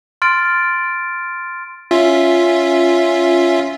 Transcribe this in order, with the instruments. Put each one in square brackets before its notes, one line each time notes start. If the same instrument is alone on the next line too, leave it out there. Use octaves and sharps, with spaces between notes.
[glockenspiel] C6 F6 A6 D7
[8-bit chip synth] C#4 F4 E5